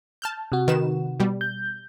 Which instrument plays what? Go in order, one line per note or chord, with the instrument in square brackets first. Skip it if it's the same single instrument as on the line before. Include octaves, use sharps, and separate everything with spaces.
[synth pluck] A5 F6 G6
[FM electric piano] C3 F#4
[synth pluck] D#3 B4 E7
B2 G3
[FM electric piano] G6